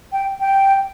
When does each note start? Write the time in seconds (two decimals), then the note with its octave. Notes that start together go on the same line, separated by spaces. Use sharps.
0.12 G5
0.40 G5